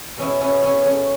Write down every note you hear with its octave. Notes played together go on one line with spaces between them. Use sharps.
B2 C#4 E4
C#4 E4
B2
C#4 E4
B2
A3 C#4